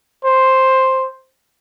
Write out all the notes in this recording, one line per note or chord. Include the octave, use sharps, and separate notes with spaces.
C5